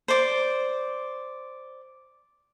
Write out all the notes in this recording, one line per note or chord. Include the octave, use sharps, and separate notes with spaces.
C5 D5